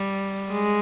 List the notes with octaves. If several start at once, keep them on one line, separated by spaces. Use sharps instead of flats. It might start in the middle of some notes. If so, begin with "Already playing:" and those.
Already playing: G3
G#3